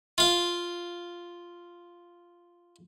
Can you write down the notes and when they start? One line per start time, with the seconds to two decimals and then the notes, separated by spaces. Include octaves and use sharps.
0.18 F4 F5